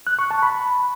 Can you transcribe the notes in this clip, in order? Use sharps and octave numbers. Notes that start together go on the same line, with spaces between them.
F#6
C#6
A5
B5